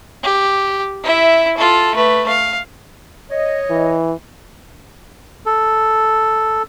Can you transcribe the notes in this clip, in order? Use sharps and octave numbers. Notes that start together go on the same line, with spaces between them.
G4
E4 E5
F4 A4
A3 B4
F5
C#5 D#5
E3
A4